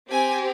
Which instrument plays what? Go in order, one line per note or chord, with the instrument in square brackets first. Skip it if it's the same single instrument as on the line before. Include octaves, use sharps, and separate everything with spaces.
[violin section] C4 G4 G#5